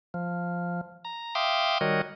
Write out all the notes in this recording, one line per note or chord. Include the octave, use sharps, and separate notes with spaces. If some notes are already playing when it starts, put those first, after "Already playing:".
F3
A#5
E5 F5 G5 C6 D6 D#6
D#3 G3 F#4 A#4 C#5 D#5